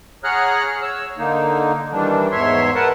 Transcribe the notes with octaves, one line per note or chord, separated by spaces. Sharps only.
G#4 C#5 F#5 A#5 F6 F#6
C#5 E6
D3 A#3 D#4
D#3 E3 G3 D4
E2 G#2 C#5 E5 C6
A#4 B4 F#5 A5